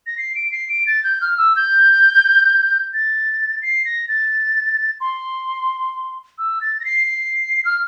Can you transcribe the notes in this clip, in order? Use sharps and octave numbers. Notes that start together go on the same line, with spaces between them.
A#6
C7
D7
C7
D7
A6
G6
F6
E6
G6
A6
C7
A#6
A6
C6
E6
A6
A#6
C7
C7
F6